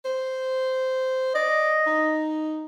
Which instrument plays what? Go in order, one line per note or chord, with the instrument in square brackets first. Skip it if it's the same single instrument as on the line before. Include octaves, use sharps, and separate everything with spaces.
[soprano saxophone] C5
[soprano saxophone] D5 [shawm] D#5
[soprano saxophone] D#4